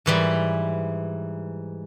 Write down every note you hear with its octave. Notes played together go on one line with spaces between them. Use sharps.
G#2 E3 G3